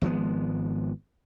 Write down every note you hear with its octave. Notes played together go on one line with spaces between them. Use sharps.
G#1 F3 G#3 B3